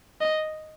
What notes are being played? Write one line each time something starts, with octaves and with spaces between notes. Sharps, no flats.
D#5